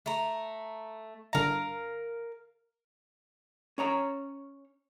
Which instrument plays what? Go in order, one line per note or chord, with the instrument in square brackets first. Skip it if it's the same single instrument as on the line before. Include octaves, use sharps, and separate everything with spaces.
[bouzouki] A3 A#5
[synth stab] G1 D3 A#5 [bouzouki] A#4 F5
[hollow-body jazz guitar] C#4 C#5 A#5